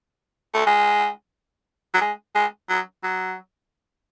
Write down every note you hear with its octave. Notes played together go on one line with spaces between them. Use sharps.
A3
G#3
F#3
G#3
G#3
F#3
F#3